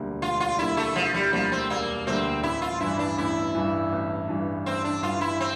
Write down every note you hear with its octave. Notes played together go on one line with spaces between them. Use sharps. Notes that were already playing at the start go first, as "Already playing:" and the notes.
Already playing: E1 D2 D3 G3 A#3
E1 F4
F4
D2 D3 G3 A#3 E4
A3
E1 F3
G3
D2 D3 F3 G3 A#3
C4
E1 A#3
D2 D3 G3 A#3 C4
A1 E4
F4
G2 E3 E4
D4
A1 E4
G2 E3
A1
G2 E3
A1 C4
D4
G2 E3 F4
E4
C4